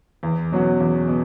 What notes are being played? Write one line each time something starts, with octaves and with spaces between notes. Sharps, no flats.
E2
B2 F#3 C#4 F#4
E2
B2